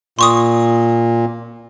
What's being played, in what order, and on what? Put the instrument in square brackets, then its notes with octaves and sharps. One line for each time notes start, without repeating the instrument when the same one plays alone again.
[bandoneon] A#2 [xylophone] C6 C#6 D#6